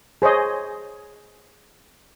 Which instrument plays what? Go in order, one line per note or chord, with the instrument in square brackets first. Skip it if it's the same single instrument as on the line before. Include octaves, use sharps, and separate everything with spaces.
[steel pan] G#4 C5 C#5 D#5